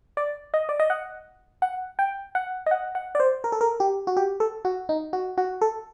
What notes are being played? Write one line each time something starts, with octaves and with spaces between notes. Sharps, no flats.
D5
D#5
D5
D#5
F#5
F#5
G5
F#5
D#5
F#5
F#5
D5
C5
A#4
A4
A#4
G4
F#4
G4
A4
F#4
D#4
F#4
F#4
A4